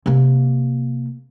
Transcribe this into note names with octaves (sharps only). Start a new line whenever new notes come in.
C3 A#3